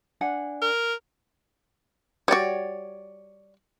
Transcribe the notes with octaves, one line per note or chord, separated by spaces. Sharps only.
D4 F#5 G#5
A#4
G3 F#4 C#5 D5